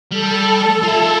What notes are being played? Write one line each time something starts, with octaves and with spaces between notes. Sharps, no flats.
G3 A4
F4 E5